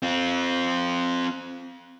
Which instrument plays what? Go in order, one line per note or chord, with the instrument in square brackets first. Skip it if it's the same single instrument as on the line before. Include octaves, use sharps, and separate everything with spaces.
[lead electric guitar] C4 F4